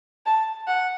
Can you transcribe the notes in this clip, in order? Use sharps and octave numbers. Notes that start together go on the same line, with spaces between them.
A5
F#5